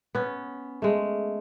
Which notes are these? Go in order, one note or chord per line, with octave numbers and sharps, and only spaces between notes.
B3 C#4
G#3 A3